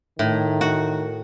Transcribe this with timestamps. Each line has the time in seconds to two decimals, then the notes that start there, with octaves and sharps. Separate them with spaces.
0.19 A2 D#3
0.61 F#4